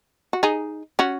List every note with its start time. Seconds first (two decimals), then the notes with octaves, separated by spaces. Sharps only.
0.33 F#4
0.43 D#4 G#4
0.99 C#4 F#4